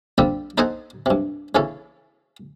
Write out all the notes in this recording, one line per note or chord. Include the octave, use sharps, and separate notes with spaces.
G3 C4 D4 F4 G4 A4
D#4 A4 C5 D#5 F#5 G#5
G2 C3
C#3 E3 C#4 A4